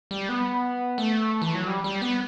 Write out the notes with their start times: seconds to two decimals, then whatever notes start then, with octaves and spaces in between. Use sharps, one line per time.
0.11 G3
0.29 B3
0.98 A3
1.42 E3
1.55 F#3
1.67 G3
1.84 G3
2.02 B3